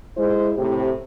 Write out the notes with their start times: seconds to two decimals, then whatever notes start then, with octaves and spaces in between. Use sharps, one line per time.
0.17 G#3 E4 C5
0.57 A2 C3 G4